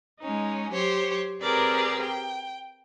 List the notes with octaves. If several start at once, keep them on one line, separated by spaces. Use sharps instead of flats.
G#3 C#4 D#4
F#3 G4 C5 C#5
C4 G4 G#4 A#4 B4 D5
G5